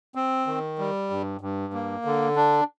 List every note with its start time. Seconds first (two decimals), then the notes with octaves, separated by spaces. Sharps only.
0.15 C4
0.47 D#3
0.79 G3
1.10 G2
1.41 G2
1.73 A#3
2.05 D3
2.36 D4